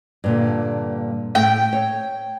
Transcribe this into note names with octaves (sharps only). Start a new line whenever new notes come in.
G2 A#2 D3
A2 A3 G5
C#5